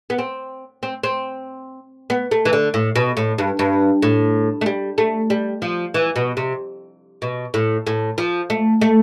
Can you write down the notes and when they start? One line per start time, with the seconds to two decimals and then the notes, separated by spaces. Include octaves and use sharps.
0.10 B3
0.19 C4
0.83 C4
1.03 C4
2.10 B3
2.31 A3
2.45 E3
2.53 D3
2.74 A2
2.96 B2
3.17 A2
3.38 G2
3.59 G2
4.03 A2
4.61 A3
4.66 G3
4.98 A3
5.30 G3
5.62 F3
5.94 E3
6.16 B2
6.37 C3
7.22 B2
7.54 A2
7.87 A2
8.18 F3
8.50 A3
8.81 A3